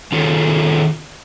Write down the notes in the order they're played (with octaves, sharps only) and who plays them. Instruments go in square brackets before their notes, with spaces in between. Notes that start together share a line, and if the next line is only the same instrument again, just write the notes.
[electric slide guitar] D#3 C#4 F4 G#4 A4 C#5